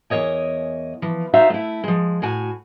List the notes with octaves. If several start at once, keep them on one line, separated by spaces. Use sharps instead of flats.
E2 A#4 C#5 D#5 G#5
E3 F3
D#4 F4 F#4 C5 E5 F5
A3 E4
F3 G#3
A2 F#4 G#5